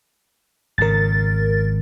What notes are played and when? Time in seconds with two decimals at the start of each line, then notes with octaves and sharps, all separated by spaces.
0.78 G#1 C#3 A#4 A6